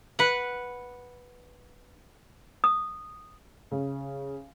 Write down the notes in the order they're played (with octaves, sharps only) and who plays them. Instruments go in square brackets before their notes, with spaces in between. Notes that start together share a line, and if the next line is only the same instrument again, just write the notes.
[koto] B4 F#5
[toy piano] D#6
[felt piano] C#3